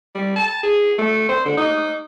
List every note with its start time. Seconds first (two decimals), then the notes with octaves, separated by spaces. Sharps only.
0.15 G3
0.36 A5
0.63 G#4
0.98 A3
1.29 C5
1.45 D3
1.57 D#4